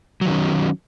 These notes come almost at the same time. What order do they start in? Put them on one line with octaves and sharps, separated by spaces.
F#3 D#3 C#4